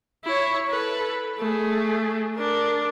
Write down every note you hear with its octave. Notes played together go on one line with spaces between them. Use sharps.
E4 C#5
A4 B4
A3 G#4
D4 A#4